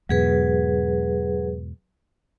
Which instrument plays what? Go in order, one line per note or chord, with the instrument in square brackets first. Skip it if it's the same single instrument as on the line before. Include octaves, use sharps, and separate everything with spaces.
[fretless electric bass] E2 G#2 B2 [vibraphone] F#3 G#4 B4